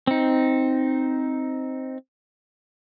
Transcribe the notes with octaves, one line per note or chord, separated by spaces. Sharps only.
C4 D#4